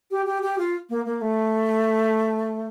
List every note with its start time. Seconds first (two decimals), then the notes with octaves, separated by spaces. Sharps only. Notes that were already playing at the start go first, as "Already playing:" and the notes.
0.11 G4
0.26 G4
0.42 G4
0.58 F4
0.90 A#3
1.05 A#3
1.21 A3